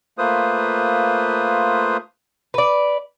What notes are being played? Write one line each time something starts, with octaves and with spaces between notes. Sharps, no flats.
A3 A#3 F4 B4 C5 D#6
B4 D5